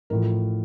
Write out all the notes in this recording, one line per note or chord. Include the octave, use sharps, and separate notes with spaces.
A1 A2 F3 A#4